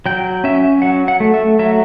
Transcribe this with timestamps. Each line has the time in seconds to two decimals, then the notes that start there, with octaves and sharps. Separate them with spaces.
0.06 F#3 G5
0.44 C#4 E5
0.82 F#3 F#5
1.08 F#5
1.20 A3
1.34 E5
1.59 F#3 E5